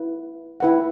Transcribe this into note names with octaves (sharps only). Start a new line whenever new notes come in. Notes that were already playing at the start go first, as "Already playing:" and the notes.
Already playing: E4 B4
E4 B4 F#5